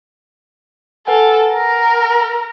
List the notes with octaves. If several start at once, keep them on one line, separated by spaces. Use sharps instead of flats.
A4 B4 F#5 G#5
A#4